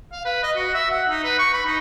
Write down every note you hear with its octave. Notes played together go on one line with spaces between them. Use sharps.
F5
B4
D#5
F#4
E5
F#5
D#4
B4
C#6
B5
D#4